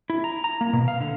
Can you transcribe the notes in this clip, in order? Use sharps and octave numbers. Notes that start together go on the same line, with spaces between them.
E4
A#5
A#5
A#3
B2
F5
D3